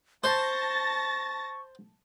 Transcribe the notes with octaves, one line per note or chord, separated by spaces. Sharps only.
C5 A5 C#6 A6 A#6